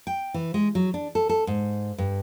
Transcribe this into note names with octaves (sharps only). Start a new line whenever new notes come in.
G5
E3
G#3
F#3
D4
A4
A4
G#2
G2